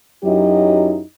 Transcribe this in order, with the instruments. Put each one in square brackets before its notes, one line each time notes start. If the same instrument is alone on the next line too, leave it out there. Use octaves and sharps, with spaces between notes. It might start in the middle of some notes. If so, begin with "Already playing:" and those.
[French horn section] F#2 F#3 D#4 E4 G4 D#5